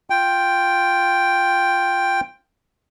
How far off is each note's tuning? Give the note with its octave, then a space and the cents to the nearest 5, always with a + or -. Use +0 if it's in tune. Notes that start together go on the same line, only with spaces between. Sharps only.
F4 +0 G5 +0